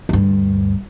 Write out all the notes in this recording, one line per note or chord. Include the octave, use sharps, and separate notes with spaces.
D2 G2